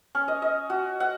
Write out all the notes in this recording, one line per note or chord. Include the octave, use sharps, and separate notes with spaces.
C#4
D#5
D#5
F#4
F#5